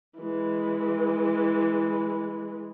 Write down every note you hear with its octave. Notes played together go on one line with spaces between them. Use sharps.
E3 G#3